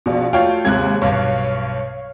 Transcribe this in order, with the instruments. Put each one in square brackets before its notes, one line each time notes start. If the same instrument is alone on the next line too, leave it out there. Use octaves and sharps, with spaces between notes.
[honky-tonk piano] A#1 B2
[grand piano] A3 C#5 F5 [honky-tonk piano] F4 F#4 G5
[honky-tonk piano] D#2 G#2 C3 [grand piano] F#6 G#6
[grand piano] B1 G2 [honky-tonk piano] C#5 F5